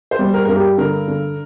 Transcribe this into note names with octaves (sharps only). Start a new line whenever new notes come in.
C5
G3
A#4
G2 A#4
G4
D3 A#4
D3